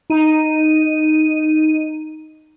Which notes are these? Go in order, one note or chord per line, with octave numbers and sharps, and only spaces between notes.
D#4 D#7